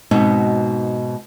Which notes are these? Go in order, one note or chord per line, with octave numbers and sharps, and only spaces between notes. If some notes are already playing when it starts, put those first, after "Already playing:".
G#2 B2 C4 D#4 F#4